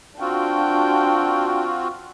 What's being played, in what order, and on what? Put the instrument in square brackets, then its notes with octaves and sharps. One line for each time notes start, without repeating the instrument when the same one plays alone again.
[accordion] C4 F4 F#4 [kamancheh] D4 G5